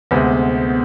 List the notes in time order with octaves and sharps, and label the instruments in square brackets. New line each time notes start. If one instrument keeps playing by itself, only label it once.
[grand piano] D2 C3 G#3 [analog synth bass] B3